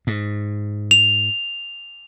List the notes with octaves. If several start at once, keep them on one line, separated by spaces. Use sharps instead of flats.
G#2
F7